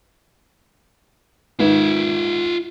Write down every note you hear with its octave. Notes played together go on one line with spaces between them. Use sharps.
G#2 D#3 F4 B4 E5